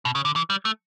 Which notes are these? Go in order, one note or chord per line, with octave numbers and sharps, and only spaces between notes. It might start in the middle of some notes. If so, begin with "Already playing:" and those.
B2
C#3
D3
E3
G3
A3